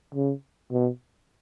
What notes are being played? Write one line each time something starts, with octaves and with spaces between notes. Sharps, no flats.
C#3
B2